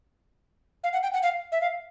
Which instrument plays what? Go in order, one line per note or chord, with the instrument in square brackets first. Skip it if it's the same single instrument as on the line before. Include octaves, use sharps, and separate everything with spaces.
[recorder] F5
F#5
G5
F#5
F5
E5
F5